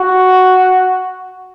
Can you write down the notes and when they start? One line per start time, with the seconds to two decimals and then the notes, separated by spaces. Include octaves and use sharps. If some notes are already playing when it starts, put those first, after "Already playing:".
Already playing: F#4